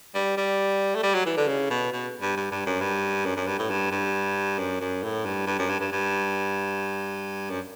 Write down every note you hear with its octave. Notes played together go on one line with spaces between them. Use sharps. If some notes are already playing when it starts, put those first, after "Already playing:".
G3
G3
A3
G3
F#3
E3
D3
C#3
B2
B2
G2
G2
G2
F#2
G2
F#2
F#2
G2
A2
G2
G2
F#2
F#2
A2
G2
G2
F#2
G2
G2
G2
F#2